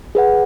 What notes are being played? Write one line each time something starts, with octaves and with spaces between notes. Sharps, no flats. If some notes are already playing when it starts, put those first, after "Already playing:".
G#4 B4 F#5